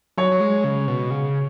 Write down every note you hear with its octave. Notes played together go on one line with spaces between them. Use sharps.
F#3 C#5
F#3
G#3
C#3
B2
C#3